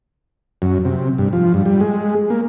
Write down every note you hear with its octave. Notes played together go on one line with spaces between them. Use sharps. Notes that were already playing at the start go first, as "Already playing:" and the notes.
F#2
C3
G2
F3
G2
G3
G#3
A#3